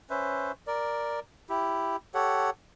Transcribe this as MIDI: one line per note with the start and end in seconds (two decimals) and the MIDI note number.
0.10 0.52 61
0.10 0.52 71
0.10 0.52 72
0.10 0.52 76
0.67 1.20 70
0.67 1.20 74
1.49 1.96 64
1.49 1.96 67
2.14 2.50 67
2.14 2.50 69
2.14 2.50 73
2.14 2.50 78